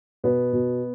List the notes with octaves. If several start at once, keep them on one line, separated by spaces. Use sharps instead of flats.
B2 B3
B2